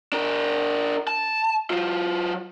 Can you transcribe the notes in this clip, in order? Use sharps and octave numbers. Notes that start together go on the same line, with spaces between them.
D4 A#4
A5
F#3 F4